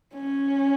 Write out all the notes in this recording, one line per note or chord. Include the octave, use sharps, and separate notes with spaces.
C#4